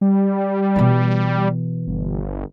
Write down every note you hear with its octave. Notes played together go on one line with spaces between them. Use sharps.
G3
B2 E3
G1